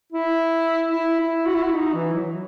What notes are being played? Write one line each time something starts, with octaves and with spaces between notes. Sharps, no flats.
E4
E4
E4
F#4
E4
F#4
D#4
E3
F#3